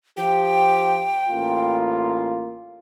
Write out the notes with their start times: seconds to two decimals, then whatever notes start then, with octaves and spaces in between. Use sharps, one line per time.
0.17 F3 G4 G5
1.28 A1 A#3 F4